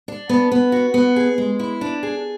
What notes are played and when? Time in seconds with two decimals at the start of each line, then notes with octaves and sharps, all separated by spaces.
0.08 D4
0.29 B3
0.51 B3
0.72 F#4
0.94 B3
1.16 G#4
1.38 G#3
1.59 E4
1.81 D4
2.03 G#4